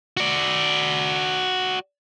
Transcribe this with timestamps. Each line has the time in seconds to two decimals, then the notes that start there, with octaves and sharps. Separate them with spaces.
0.17 F#4 D5